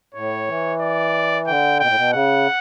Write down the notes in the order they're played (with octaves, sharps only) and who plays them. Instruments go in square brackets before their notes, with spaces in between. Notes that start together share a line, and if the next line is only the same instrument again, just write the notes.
[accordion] A2 [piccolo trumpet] C#5
[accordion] E3
[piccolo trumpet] D5
[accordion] D3 [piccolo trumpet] G5
[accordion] B2 [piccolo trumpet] G5
[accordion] A2
B2
[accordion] C#3 [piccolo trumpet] F#5